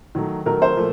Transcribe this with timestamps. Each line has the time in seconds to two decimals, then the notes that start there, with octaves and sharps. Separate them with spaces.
0.15 D#3 F#3 A3
0.46 D#3 F#3 A3 A#4
0.62 C5
0.76 A#2 F3 A3